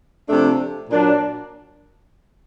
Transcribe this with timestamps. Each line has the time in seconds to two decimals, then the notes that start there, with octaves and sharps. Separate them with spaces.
0.29 C3 F3 A3 D4
0.89 A#2 F#3 A#3 D4